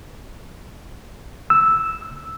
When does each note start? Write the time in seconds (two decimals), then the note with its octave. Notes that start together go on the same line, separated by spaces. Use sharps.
1.50 E6